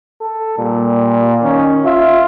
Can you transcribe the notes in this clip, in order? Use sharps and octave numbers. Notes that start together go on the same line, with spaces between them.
A4
A#2 G3
D#3 C#4
F4 E5